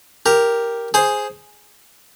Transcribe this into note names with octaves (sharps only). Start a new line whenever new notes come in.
G4 A#4
G#4 C5